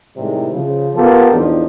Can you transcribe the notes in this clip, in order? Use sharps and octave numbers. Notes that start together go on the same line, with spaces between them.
A2 C3 D#3 G3 G#3
C#3 F3
B3 F4 G4 A4 A#4
E2 A2 F3 D4 D#4